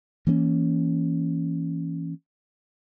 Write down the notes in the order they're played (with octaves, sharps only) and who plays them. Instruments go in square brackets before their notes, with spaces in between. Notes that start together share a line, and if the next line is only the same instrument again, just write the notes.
[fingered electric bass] E3 A#3 B3 C#4